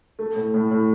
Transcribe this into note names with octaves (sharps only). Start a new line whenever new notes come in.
A3
A2
A2
A2